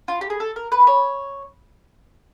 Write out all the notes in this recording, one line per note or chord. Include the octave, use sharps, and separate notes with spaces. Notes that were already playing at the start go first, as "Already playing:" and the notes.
F4
G4
G#4
A4
A#4
B4
C#5